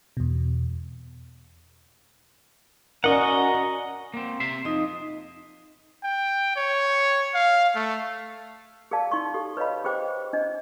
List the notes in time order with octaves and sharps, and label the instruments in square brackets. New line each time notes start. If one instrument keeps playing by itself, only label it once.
[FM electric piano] E2 B2
[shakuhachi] C#4 [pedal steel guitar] F#4 D#5 F#5 [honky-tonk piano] A#4 D5 [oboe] A#5
[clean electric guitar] A#3 C4
C3 E5 C6
[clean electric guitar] F2 [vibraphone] D#4 D#5
[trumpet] G5
C#5
F5
A3
[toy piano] G#4 A#4 D5 F5 A5
D#4 C6 C#6
G4 A4
B4 C#5 D#5 F5 B5
G4 G#4 B4 C5 G5 D6
D4 D#5